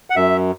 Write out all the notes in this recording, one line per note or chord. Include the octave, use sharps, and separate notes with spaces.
F#5
F#2 E5